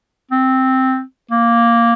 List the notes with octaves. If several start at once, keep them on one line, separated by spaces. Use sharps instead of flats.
C4
A#3